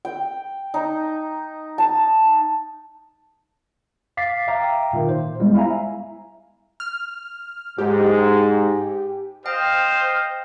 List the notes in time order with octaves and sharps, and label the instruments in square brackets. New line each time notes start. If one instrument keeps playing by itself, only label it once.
[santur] G5
D#4
A5
[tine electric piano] F5 D6 A6 B6 C7
E5 F5 G5 A#5 D6
A#2 D#3
C5
G3 G#3 B3 E4
E4 E5 F5 G#5 A#5
[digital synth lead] F6
[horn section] G#2 [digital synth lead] G4
[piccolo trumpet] C5 [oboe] D#5 [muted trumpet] F5 [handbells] G5